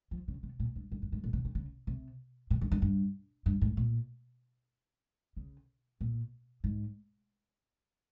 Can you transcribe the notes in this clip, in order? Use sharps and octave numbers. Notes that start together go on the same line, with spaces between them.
F3
C#3
C3
A#2
G2
G2
G2
G#2
A#2
C3
C#3
C#3
C3
A#2
G2
G2
G2
G2
G#2
A#2
C#3
A#2
G#2